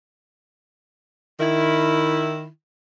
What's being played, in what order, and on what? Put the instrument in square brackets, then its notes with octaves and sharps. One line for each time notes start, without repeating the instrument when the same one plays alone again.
[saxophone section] D#3 E4